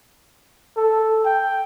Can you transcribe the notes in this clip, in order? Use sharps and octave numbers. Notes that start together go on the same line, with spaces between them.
A4
G5